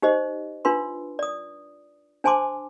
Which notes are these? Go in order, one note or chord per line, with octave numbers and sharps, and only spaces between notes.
D#4 G4 C5 D#5
D4 F4 B4 C6
D5 D#6
D4 C5 G#5 A5 C6 D6